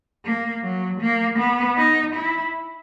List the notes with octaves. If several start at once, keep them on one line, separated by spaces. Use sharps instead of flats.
A#3
F#3
A#3
B3
D#4
E4